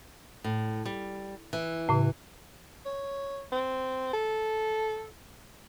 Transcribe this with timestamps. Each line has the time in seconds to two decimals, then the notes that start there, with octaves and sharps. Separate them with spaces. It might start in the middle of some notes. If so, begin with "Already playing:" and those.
0.44 A2
0.86 G3
1.53 E3
1.89 A2 C#3
2.86 C#5
3.52 C4
4.13 A4